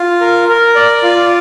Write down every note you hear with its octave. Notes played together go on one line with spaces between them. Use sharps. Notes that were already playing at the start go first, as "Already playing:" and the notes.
Already playing: F4
A#4
A#4
D5
F4